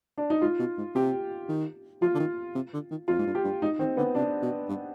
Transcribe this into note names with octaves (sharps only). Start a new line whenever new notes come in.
D4
D#4
G#2 F4
B2
G#2
C3 G4
D#3
F3 F4
D3
D#3
C3
D3
D#3
F2 F4
G#2
G2
G4
G2
G#2 D#4
D#3 C4
D3 B3
C3 D4
B2
G2